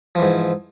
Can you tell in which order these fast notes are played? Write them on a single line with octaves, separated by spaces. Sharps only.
F3 E3 G#2